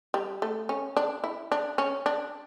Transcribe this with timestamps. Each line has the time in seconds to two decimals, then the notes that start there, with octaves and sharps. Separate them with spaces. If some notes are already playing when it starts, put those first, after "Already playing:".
0.14 G3
0.42 A3
0.69 C#4
0.97 D4
1.24 E4
1.52 D4
1.78 C#4
2.06 D4